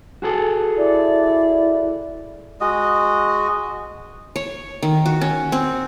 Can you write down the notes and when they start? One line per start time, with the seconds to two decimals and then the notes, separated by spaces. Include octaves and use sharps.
0.22 F#4 G#4 A4
0.78 E4 D5
2.61 G#3 F#4 D#5
4.36 C#5
4.83 D#3
5.06 F#4
5.21 C#4
5.52 C4